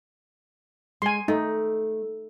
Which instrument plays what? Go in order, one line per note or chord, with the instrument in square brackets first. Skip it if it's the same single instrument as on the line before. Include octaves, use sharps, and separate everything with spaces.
[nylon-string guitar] G#3 [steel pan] G#5 C6
[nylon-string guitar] A3 [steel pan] D#4